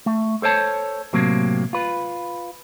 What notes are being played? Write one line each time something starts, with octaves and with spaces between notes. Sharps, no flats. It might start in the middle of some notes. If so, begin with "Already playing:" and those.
A3
A4 C5 C#5 A5
A2 C3 F#3 A#3 C4
F4 B4